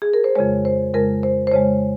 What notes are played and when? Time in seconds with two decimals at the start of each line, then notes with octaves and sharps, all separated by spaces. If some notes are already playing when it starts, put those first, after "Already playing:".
0.02 G#4
0.14 A#4
0.24 C5
0.36 F2 C#3 G#3 C#5
0.65 C5
0.94 F2 C#3 G#3 A#4
1.23 C5
1.47 C5
1.52 F2 C#3 G#3 C#5